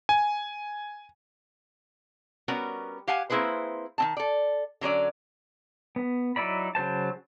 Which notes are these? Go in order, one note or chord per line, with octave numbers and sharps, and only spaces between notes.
G#5
G3 B3 C#4 F#4 A#4
G4 F5 F#5 G#5
A#3 C4 E4 G#4 B4 C5
D#3 C4 A5
A4 D5
D3 F#3 C#4 D5
B3
F#3 D#4 E4 D5 B5
C#3 F#3 C5 A5